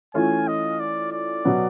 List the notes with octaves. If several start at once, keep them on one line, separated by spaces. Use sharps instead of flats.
E3 A3 C#4 F4 G#5
D#5
D5
D5
B2 F#3 B3